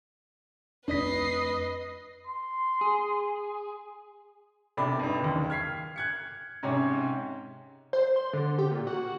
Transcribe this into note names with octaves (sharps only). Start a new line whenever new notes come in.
F2 A3 D4 B4 D5 D#5 B6 C7
C6
G#4
B1 C3 D4 B5
G2 D#4
F#1 D#2
F6 G#6 B6 C7
F#6 G#6 C#7
G#2 C3 C#4 C#5
C5
C6
D3
G4
A#2
F#4